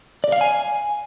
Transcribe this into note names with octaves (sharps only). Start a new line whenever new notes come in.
D5
F5
G#5